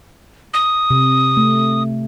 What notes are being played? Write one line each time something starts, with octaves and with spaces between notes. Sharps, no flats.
D#6
C3
A3